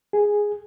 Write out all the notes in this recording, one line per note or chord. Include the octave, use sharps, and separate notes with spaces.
G#4